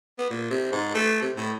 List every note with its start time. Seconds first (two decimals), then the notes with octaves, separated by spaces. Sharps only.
0.18 B3
0.30 A#2
0.51 C3
0.72 G#2
0.94 A3
1.22 C3
1.37 A2